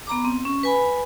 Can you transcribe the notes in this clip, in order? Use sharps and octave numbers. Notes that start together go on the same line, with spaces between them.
B3 A#5 D6
C4
C#4
B4 G#5 B5